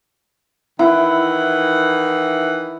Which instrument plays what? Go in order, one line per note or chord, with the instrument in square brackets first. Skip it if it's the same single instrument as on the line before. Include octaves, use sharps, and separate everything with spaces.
[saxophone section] D#3 E3 F#5 [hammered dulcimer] E4